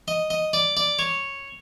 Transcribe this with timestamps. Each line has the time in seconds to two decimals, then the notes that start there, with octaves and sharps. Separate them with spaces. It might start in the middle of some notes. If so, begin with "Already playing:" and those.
0.08 D#5
0.30 D#5
0.53 D5
0.77 D5
0.99 C#5